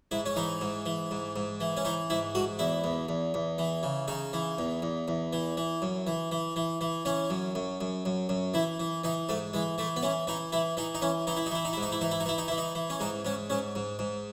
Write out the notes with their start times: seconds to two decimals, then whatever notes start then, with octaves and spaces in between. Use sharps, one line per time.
0.11 G#2 E4
0.26 C#4
0.36 E3 D#4
0.61 G#2
0.86 E3
1.11 G#2
1.36 G#2
1.60 E3
1.77 C#4
1.85 E3 D#4
2.10 G#2 E4
2.35 G#2 F#4
2.59 E2 E4
2.84 E2
3.09 E2
3.34 E2
3.58 E3
3.83 C#3
4.08 C#3 D#4
4.33 E3
4.58 E2
4.82 E2
5.08 E2
5.33 E3
5.57 E3
5.82 F#2
6.07 E3
6.32 E3
6.56 E3
6.81 E3
7.05 E3 C#4
7.30 F#2
7.55 F#2
7.81 F#2
8.05 F#2
8.29 F#2
8.54 E3 E4
8.80 E3
9.04 E3 D#4
9.29 G#2 A3
9.53 E3 G#3
9.78 E3 A3
9.96 B3
10.02 E3 C#4
10.27 E3 D#4
10.52 E3 E4
10.77 E3 D#4
10.95 D#4
11.02 E3 C#4
11.27 E3 D#4
11.37 E4
11.46 D#4
11.51 E3 E4
11.65 D#4
11.73 G#2 E4
11.83 D#4
11.92 E4
12.01 E3 D#4
12.11 E4
12.20 D#4
12.26 E3 E4
12.38 D#4
12.48 E3 E4
12.58 D#4
12.75 E3
12.90 C#4
13.00 G#2 D#4
13.25 G#2 C#4
13.50 G#2 C#4
13.75 G#2
13.99 G#2